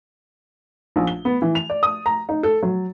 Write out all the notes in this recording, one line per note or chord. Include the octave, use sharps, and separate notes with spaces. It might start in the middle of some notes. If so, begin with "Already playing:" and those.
A#1
G7
B3
E3
F7
D5
D#6
A#5
D#4
A4
F#3